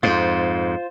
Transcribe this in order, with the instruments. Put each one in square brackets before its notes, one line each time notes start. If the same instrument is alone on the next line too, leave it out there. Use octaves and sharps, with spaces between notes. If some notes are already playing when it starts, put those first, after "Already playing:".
[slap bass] F2 G#2 [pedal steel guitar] F4 C5